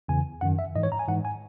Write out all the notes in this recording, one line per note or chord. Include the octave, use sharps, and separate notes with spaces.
E2 C#3 E3 G#5
F#2 D#3 F#5
E5
G#2 E3 D#5
C#5
A#5
G#5
G#2 E3 F#5
G#5